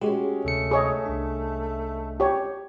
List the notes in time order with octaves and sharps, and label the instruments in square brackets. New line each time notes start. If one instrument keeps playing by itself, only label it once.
[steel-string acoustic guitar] G#3 C#4 [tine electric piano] F#4 G4
[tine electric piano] D2 C3 C#7 [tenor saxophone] A3
[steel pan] G#4 C#5 D#5
[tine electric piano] C2 D4
[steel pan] G4 C#5